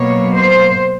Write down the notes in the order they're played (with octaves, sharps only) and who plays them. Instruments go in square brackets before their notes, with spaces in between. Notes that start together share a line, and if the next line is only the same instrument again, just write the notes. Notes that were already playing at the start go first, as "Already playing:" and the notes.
Already playing: [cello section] B2 F#3 A#3 C#5
C5